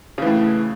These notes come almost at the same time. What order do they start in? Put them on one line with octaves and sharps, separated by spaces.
C#3 E3 A2